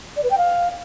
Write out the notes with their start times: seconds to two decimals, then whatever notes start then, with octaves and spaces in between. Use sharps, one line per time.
0.16 D5
0.23 B4
0.31 G5
0.38 F5